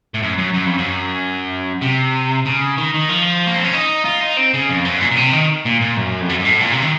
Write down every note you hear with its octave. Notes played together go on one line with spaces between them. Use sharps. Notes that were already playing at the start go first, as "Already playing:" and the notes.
A2
F#2
F#2
F#2
F2
F#2
C3
C#3
D#3
D#3
F3
A#3
C4
C#4
D#4
F4
D#4
C4
C#3
F2
F#2
A#2
A#2
C3
D#3
A#2
A#2
F#2
F2
F#2
F#2
A2
A#2
C3
D#3